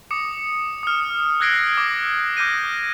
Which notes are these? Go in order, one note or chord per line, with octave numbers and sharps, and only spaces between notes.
D6 D#6 C#7
D#6 F6
E6 F#6 G#6 A#6 C7 D7
D6
D6 F6 G6 A#6 D#7